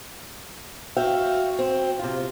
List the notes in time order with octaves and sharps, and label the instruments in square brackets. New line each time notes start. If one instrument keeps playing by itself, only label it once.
[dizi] F#4 [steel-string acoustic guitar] E5 F5 G5
[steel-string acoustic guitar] C4
C3 F4